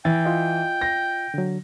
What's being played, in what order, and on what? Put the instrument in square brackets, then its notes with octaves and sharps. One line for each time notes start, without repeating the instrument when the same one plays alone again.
[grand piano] E3 [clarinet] G5 [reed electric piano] A6
[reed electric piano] F4 D#5
[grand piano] A#6
[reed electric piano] D3 F#3